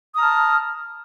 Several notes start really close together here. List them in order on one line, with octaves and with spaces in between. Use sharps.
D#6 A#5 F6 A5